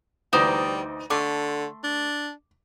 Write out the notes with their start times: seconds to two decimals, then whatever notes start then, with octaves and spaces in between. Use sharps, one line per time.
0.33 D2 E3 G3 D#4 C5 D5
1.10 D3 A3 C6 D6
1.84 D4